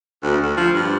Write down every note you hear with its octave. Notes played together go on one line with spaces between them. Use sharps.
D2
D2
F3
G2